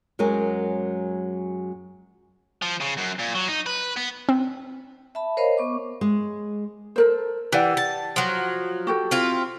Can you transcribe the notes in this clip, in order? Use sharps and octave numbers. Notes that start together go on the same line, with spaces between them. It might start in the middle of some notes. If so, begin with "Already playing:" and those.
F#2 F#3 G#3 A#4 G#5
F3
C#3
F#2
A#2
F#3
D#4
B4
B3
C4
E5 A5 B5
A#4 C5 C#5 D#5 F5 B5
B3 C#6 D6
G#3
A4 A#4 C5
E3 G4 D5 F#5
A5
F3 F#3
F#4 G4 A4
C4 E4 F4